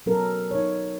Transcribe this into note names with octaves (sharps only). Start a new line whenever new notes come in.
F#3 B3 C#4 A4 A#4
D#4 C#5